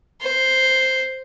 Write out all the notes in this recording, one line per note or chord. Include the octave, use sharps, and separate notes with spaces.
C5